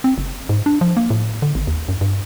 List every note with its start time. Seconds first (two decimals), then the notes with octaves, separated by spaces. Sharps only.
0.04 C4
0.18 F#1
0.49 G#2
0.66 D4
0.81 F3
0.97 A#3
1.10 A2
1.42 D3
1.55 G#1
1.67 D#2
1.89 F#2
2.01 G2